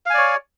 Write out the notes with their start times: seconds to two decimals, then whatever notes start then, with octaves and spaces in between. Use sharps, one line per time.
0.06 F5
0.10 G#5
0.14 D5
0.18 C#5